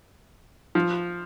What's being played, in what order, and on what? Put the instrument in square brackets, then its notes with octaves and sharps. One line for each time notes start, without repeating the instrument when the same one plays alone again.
[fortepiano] F3